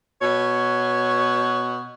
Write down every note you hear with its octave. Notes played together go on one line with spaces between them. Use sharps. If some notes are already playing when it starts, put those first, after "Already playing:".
B2 C#5